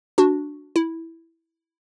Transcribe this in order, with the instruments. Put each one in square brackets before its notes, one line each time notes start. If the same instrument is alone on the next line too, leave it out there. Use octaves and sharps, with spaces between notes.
[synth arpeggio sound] D4 F#4
E4